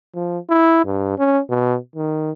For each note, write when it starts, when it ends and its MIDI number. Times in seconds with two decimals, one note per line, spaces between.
0.15 0.39 53
0.49 0.81 64
0.85 1.13 43
1.18 1.39 61
1.49 1.77 47
1.95 2.31 51